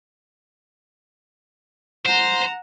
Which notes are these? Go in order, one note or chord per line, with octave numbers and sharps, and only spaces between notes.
C5 F#5 A#5